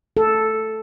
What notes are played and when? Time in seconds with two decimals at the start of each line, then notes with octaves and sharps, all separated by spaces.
0.17 A4